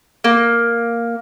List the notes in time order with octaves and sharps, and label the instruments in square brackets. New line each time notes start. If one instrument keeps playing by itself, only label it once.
[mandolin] A#3